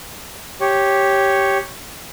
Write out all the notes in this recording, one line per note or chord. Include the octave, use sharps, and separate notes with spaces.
G4 C#5